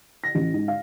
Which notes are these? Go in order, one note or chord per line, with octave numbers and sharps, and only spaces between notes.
A#6
A1
G#2
F5